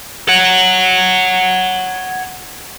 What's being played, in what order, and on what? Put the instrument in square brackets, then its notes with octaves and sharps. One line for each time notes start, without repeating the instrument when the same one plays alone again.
[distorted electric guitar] C#5 F#5